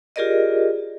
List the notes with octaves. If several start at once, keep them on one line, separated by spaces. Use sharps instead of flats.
F4 G4 G#4 A#4 D5 D#5